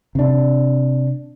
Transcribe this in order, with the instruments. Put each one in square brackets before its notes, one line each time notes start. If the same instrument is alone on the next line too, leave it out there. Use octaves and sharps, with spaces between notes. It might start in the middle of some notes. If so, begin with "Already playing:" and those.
[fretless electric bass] C3 D4